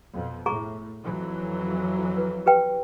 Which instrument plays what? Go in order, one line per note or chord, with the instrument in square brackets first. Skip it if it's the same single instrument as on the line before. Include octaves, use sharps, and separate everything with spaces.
[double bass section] F2 B2
[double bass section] A2 [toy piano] G#4 A#5 C#6
[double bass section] F2 E3 F#3
[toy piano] B4
G4 B4 G5